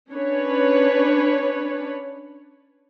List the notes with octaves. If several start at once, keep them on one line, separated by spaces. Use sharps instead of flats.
C#4 D4 B4 C#5